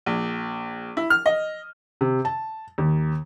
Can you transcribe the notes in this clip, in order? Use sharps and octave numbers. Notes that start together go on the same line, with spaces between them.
A#1
E4
F6
D#5
C3
A5
D#2